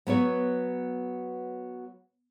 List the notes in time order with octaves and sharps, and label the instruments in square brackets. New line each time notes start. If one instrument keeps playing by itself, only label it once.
[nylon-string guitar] F#3 B3 B4 C#5